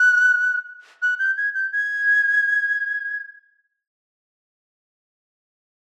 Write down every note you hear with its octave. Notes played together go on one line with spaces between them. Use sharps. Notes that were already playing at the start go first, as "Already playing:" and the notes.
Already playing: F#6
F#6
G6
G#6
G6
G#6